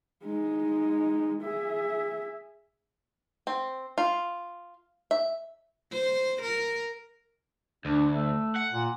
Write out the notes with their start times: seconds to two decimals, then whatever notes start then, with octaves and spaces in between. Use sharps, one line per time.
0.24 G#3 D#4
1.42 G#4 E5
3.47 C4
3.98 F4
5.11 E5
5.92 C5
6.42 A#4
7.85 D2 D4
8.12 A3
8.56 F#5
8.72 A#2